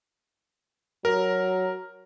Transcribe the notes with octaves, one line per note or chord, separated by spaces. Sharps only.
F#3 A#4